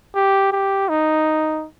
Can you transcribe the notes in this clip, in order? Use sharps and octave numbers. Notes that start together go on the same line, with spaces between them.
G4
G4
D#4